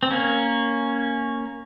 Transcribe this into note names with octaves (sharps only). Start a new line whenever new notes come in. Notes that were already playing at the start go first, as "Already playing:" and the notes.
C4
A#3 C#4